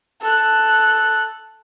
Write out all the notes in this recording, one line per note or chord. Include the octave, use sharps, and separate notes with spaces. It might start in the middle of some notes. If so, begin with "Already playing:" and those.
A4 F#6